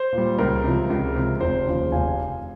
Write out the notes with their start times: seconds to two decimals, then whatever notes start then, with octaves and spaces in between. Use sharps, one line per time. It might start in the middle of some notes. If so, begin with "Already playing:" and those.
Already playing: C5
0.12 A#2
0.18 G3
0.38 C#2 A#4
0.64 C3 F3
0.90 C#2
1.16 C3 F3
1.40 F1 C5
1.67 D#2 C#3 F3
1.92 F1 F5 G#5